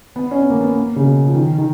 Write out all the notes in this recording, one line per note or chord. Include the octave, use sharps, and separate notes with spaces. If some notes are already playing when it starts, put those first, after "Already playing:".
B3
C#4
B3
A#3
B3
A#3
C#3
B2
F3
D#3
D#3